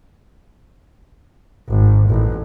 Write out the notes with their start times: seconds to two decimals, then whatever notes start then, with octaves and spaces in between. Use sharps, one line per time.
1.69 G#1
2.08 A1